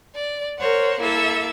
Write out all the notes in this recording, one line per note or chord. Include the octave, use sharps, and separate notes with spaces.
D5
A#4 C5 C#5 F#5
A#3 E4 A4 E5